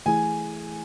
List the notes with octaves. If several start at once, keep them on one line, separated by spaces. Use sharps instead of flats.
E3 A3 E4 G#4 G#5